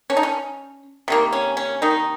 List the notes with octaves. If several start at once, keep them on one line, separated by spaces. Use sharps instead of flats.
C#4
D#4
C#4
C3 D#3 A#3
C#4
C#4
D#3 D#4